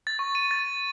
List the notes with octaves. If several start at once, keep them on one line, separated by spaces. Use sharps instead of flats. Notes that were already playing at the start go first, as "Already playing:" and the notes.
A6
C#6
D#7
A6